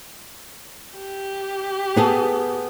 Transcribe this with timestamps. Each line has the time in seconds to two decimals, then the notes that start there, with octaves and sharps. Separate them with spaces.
0.97 G4
1.96 B3 G#4 A4